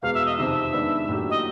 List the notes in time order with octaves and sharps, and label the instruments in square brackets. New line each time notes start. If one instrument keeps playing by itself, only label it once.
[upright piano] E2 B2 G#3 [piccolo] F5
[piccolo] E5
D#5
[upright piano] F2 C3 D#3 [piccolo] E5
[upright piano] D#3 G#3 B3 D4
A2 F#3 A#3 D4 G4
[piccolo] D#5